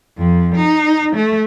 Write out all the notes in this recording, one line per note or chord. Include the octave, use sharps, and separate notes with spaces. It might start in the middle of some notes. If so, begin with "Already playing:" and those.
F2
D#4
A3